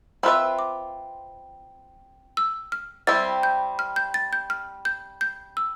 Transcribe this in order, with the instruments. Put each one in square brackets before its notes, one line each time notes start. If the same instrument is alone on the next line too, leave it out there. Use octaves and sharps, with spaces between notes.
[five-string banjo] C4 F4 B4 E5 [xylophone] B5
[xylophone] D6
E6
F6
[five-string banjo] G3 C4 E4 [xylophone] A6
[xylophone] G6
F6
G6
A6
G6
F6
G6
G6
E6